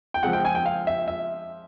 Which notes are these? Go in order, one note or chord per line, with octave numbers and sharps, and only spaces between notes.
G5
F3 G#3 C4 F#5
G5
G#5
G5
F5
E5
E5